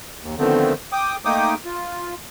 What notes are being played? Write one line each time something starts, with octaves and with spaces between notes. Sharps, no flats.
D#2
D3 D#3 F3 A3 B3 C4
G5 D6 D#6
A3 A#3 D#4 G5 D6 D#6
F4